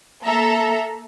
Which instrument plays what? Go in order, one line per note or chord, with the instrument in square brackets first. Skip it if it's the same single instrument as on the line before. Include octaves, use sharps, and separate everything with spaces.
[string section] A#3 A4 E5 A#5